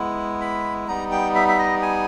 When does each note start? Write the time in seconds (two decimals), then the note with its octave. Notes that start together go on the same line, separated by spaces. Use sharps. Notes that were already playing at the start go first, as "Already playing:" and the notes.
Already playing: G#3 B3 E4
0.41 B5
0.88 G3 B3 D#4 A#5
1.12 G5
1.35 E5
1.48 E5
1.59 D#5
1.82 G#5